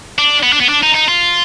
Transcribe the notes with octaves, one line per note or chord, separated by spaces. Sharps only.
D4
B3
D4
B3
D4
D#4
D#4
F4